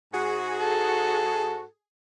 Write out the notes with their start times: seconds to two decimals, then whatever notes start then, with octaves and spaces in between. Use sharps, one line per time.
0.14 G#2 F#4 G#4
0.60 A4